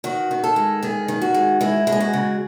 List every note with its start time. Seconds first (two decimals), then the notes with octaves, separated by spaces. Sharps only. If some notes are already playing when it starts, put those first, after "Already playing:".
0.04 D#3 F#4
0.31 D#3
0.44 A4
0.56 G#3
0.83 D#3 G#4
1.08 D#3
1.22 F#4
1.34 G#3
1.61 G#3 E4
1.87 G#3
1.92 G#4
2.00 F#4
2.13 C#3